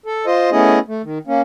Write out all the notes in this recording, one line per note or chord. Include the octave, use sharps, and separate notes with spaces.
A4
F4 C5 D#5
A3 B3 C#4 E4 G#4 D#5
A3
D#3
A#3 C#4